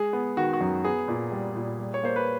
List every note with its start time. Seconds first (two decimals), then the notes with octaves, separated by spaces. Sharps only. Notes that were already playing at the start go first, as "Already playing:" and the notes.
Already playing: G#3 G#4
0.13 B3
0.37 D#3 F#4
0.53 F#4
0.61 F#2
0.84 B3 G#4
1.08 A#2
1.32 G3
1.55 A#2
1.80 G3
1.94 C#5
2.03 A#3 C5
2.16 B4